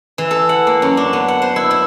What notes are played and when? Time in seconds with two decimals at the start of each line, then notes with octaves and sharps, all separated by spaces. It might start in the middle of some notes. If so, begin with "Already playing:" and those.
0.18 E3
0.31 A4
0.49 F#5
0.67 A#3
0.82 F#2
0.97 D4
1.13 B3
1.28 F#5
1.42 C5
1.56 E4
1.71 E4